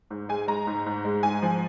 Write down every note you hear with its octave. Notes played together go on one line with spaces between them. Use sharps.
G#2
G#3 G#5
G#3 A#5
G#2
G#2
G#3
G#2 G#5
F3